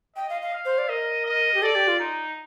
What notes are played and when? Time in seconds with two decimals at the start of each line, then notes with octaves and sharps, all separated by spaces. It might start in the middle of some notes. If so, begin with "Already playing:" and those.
0.16 D#5 G5
0.29 F5
0.42 F5
0.53 F5
0.65 C5
0.78 D5
0.89 A#4 D#5
1.26 D#5
1.54 G4
1.62 A4 D5
1.75 G4
1.88 F4
2.00 D#4